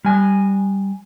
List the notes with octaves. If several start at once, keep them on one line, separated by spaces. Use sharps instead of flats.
G3 G#5